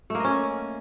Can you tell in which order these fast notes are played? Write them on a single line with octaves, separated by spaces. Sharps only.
A3 A#3 D#5 C#4